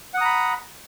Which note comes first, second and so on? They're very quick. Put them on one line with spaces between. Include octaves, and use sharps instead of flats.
F#5 D#6 A#5 B5